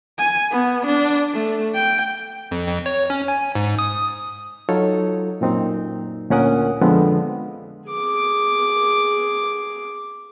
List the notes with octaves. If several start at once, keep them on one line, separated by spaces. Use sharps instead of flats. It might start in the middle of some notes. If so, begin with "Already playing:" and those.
G#5
B3
D4
A3
G5
F2
F2
C#5
C#4
G#5
G#2
D#6
F#3 D#4 F4 A4 C#5
F#2 A#2 C4 D#4
D2 A#2 C#4 A#4 F#5 D#6
F2 D3 F3 G#3 B3 C4
G#4 D6